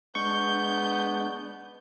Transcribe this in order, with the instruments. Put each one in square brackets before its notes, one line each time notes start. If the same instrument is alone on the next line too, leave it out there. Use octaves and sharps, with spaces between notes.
[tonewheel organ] G#3 D4 [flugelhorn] B3 [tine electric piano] C#6 [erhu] G6